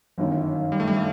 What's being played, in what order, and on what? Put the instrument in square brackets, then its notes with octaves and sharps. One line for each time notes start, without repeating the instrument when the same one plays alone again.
[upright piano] G1 F#2 D#3
[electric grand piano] G3
A3
G3
A3